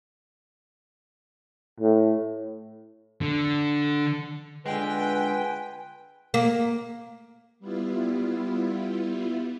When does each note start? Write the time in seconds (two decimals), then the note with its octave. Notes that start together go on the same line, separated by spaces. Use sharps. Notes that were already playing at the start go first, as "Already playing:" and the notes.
1.80 A2
3.21 D3
4.66 D3 G#3 B3 F4 B4 G5 G#5
6.34 A#3
7.59 G3 B3 E4 F4